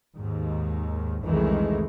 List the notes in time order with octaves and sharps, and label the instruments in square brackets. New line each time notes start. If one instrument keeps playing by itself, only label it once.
[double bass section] D#2 G#2 D#3
C2 F2 D#3 E3 G#3 A3